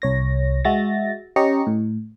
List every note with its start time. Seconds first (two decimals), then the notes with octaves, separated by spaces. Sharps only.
0.02 C2 C#5 A#6
0.65 G#3 F#4 E5 A6 A#6
1.36 C#4 G4 D#5 A#5 C#6 C#7
1.67 A2